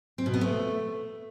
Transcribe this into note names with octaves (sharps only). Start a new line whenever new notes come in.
C4
B2
B3
A3